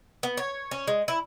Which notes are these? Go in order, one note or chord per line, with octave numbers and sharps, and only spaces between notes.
B3
C#5
C#4
G#3
E4